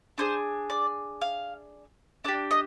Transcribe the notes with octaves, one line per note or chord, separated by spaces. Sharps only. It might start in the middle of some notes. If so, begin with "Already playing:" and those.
D4 G#4 C5
D5
F5
D4 G4 D5
D#5